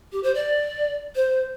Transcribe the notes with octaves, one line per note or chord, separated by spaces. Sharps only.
G4
C5
D5
C5